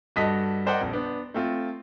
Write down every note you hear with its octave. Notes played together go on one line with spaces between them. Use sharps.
G2 F#4 A4 D#5 D#6 B6
A#4 C5 D5 D#5 F#5 G5
A#1 F2
B3 D4
A3 C4 F4